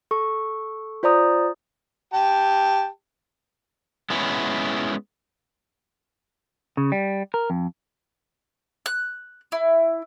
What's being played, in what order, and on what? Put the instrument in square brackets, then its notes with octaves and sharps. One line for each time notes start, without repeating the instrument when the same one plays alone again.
[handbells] A4 C#6
F4 C5 D5 A#5 D#6
[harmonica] G4 G5 A5
[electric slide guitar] G#3 B3 C#4 E4
[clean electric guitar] C#3
G3
A#4
F2
[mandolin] F#6
E4